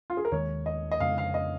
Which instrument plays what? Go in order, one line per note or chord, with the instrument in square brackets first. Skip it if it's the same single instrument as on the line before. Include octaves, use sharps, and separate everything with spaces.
[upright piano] F4
G#4
A#4
[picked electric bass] D#2 D#3 G#3 [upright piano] C#5
[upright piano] D#5
D#5
[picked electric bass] F2 C#3 G#3 [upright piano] F5
[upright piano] F5
D#5